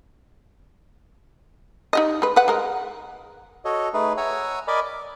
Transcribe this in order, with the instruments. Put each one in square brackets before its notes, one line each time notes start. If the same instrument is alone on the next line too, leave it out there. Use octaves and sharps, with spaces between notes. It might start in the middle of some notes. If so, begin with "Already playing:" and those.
[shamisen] D#4 G4 D#5
G#3 B4
B4 F#5
G#3 A#4
[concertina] F#4 A4 C#5 D#5
A3 D#4 G#4 B4
C#5 F#5 G#5 A#5 E6
A#4 D5 D#5 G#5 B5 D6
D6